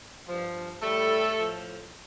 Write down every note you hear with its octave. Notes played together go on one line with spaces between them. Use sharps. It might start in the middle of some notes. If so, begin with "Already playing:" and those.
G2 F3
A2 G3 A3 A4
A2 F3